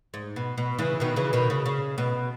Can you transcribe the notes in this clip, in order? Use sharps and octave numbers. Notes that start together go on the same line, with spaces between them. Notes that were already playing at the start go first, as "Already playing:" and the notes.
G#2
B2
B2
C#3 E3
B2 D#3
C#3 E3
B2 D#3
C#3
C#3
B2